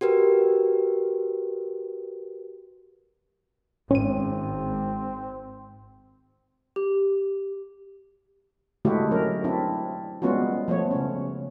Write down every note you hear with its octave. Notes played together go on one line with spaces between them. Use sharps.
F#4 G4 A#4 B4
G#1 C4 C#4 D#7
G4
D3 G#3 A3 E4 F#4 G4
F#3 C#4 A#4
C4 D4 E4
G3 G#3 B3 C#4 F4 F#4
F3 A3 B3 C#5
C#3 C#4